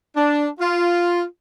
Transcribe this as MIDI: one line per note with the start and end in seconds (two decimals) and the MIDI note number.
0.16 0.48 62
0.60 1.23 65